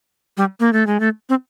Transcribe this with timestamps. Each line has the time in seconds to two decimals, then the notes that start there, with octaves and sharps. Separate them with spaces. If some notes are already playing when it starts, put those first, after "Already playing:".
0.37 G3
0.60 A#3
0.73 A3
0.87 G#3
1.00 A3
1.29 C4